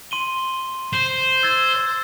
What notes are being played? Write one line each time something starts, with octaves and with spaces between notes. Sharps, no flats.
C6 D#7 G7
C5
E6 G#6 A6